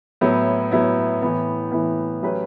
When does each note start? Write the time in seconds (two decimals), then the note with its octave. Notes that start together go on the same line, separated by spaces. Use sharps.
0.21 A2 F#3 B3 E4
0.71 A2 F#3 B3 E4
1.22 A2 E3 B3
1.72 A2 E3 B3
2.23 F#3 A3 C#4 G4 B4